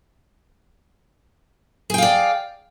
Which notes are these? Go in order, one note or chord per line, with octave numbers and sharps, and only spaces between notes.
G#4 D5 F5 G5